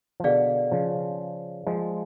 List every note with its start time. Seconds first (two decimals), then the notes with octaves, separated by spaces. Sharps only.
0.20 F3
0.24 B2 D3 G#4 D5 F5
0.72 C#3 F3
1.67 F3 G#3